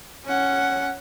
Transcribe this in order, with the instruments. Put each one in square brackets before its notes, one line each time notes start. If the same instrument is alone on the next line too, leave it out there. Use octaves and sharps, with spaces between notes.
[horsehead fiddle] C#4 F#5